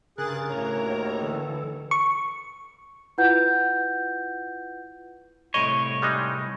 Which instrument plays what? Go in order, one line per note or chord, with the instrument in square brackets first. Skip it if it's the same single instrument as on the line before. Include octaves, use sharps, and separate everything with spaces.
[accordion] G2 G#4 F#6 [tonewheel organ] C#3 A6 [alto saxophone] A#4
[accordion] D2 A2 [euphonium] C#3 [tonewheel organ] C#5 A#5
[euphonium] D#2
[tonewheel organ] D3 E3 A4
[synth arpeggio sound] C#6
[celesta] E4 F4 B4 F#5 G6
[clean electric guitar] C2 A2 C#5 [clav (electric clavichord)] D#5
[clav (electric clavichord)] G3 G#3 D#4